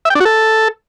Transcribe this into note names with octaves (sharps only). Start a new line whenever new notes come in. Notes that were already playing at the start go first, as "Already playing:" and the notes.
E5
G5
D4
F#4
A4